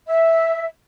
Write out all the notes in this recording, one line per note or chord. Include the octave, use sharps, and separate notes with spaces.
E5